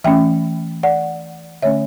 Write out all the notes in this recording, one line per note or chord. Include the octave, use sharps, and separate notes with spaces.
E3 A3 C#4 E5 G5
D5 F#5
D3 A3 C#4 C#5 E5